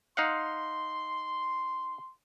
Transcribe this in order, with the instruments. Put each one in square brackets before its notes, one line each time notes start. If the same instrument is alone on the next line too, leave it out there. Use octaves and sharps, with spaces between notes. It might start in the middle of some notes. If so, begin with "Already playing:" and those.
[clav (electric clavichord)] D#4 F5 F#5 [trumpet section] C6